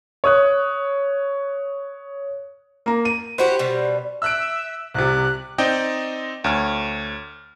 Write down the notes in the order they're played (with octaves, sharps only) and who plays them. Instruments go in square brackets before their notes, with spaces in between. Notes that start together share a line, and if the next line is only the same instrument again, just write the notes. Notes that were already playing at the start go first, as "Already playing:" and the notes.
[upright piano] C#5 D#6 F#6
[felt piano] A#3 A#5
D#7
[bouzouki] E4 F#4 G4 [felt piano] C5
[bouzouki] B2 G3
[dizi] E5 [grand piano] E6 F#6 D7
[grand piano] C2 C3 [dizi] F#6
[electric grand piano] C4 D#4 D5 D#5 G5
D2 C#5 F6